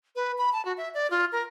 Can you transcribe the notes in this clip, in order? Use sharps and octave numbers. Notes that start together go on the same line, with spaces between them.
B4
B5
A5
F#4
E5
D5
F4
A#4